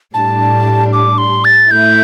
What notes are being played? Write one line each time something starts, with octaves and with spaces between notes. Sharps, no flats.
A2 G3 D4 A5
D6
C6
A6
A2 A3 E4 G6